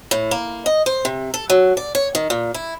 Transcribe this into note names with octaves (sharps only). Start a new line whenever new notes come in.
A2
A#3
D#5
C5
C3
A4
F#3
D5
C#5
D#3
A#2
E4